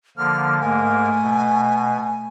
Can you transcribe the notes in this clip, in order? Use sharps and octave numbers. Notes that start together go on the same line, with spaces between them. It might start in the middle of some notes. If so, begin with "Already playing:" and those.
D3 F3 A#3 F6
G#2 A3 A#3 A#4 G#5
B2